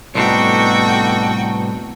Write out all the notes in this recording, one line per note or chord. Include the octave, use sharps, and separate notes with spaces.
C2 A2 B3 D4 D#4 F#4 A4 G5